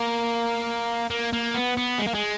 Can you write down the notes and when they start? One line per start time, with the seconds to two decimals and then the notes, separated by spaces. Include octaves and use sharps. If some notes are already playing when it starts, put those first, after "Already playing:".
Already playing: A#3
1.10 A#3
1.33 A#3
1.54 B3
1.77 B3
1.99 G#3
2.07 A#3
2.14 G#3